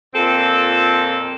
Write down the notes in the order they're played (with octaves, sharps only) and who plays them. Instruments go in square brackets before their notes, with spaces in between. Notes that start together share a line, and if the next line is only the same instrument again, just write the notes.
[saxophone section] F2 A#2 C4 A4